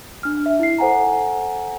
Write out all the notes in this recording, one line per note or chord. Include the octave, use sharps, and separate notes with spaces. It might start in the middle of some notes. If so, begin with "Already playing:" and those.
D4 F6
E5
E4 C7
A4 C5 F#5 G#5 A#5